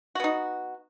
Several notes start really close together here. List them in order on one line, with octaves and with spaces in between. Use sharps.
F#4 B3 D#4